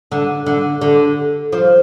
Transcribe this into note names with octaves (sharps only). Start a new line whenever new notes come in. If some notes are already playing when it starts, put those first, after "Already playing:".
D3
D3
D3
F3